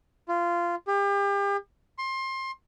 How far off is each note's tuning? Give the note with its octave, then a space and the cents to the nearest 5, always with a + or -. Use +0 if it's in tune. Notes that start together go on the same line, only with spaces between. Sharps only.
F4 -15
G4 +35
C6 +25